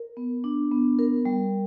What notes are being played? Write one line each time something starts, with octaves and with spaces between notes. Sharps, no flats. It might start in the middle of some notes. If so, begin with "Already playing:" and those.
Already playing: A#4
B3
D4
B3
A#4
G3